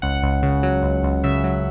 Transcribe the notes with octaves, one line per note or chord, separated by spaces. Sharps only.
C#2 F#5
C#2
C#3
F#3
C#2
C#2
C#3 E5
F#3